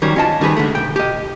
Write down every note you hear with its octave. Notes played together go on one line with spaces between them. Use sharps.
D#3 F#3 G3 C#4
C#4 F4 D#5 A5
D#3 G3 G#4 B4
D3 G#3 A3
B1 G5
G4 D#5